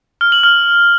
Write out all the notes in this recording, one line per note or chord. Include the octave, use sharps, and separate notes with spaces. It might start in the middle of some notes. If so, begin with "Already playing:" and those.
F6
F#7
F6